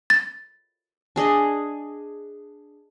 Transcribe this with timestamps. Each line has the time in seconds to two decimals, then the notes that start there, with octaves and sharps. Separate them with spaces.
0.10 A6
1.16 D4 G#4 D#5